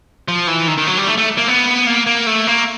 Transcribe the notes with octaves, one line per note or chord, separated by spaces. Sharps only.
F3
E3
D#3
D#3
F#3
G3
A3
A3
A#3
B3
A#3
A#3
A3
A#3